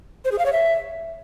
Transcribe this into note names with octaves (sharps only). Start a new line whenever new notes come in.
C5
G#4
F5
C#5
E5